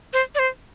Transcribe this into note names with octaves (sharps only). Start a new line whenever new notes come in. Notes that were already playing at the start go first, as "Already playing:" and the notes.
C5
D5
C5